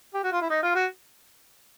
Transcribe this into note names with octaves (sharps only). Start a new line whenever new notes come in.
G4
F#4
F4
E4
D#4
F4
F#4